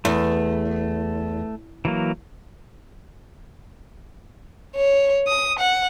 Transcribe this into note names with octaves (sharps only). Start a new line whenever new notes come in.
E2 A3
E3 F#3 A#3
C#5
D#6
F#5